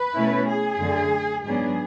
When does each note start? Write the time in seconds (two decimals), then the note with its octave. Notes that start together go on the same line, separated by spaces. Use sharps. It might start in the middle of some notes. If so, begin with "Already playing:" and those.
Already playing: B4
0.14 B2 A3 C#4 E4
0.46 G#4
0.79 F#2 D3 A3
1.44 G#2 F#3 B3 D4 G#4